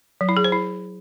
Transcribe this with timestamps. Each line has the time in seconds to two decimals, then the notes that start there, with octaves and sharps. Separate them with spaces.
0.21 F#3
0.29 E4
0.37 G#4
0.44 C5
0.52 E4